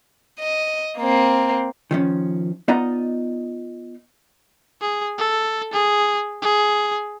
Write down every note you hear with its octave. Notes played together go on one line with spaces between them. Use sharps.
D#5
A#3 C4
D#3 F3 C#4
B3 D#4 F4 D5 D#5 A#5
G#4
A4
G#4
G#4